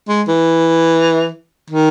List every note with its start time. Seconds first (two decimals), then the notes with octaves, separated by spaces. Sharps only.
0.08 G#3
0.28 E3
1.70 D#3